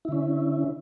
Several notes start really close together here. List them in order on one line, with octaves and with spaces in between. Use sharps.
E4 D3 C#4